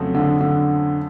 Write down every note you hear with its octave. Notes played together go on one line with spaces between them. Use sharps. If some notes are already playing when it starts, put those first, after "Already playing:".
Already playing: F2 C#3 F#3 A3 C4
D3
D3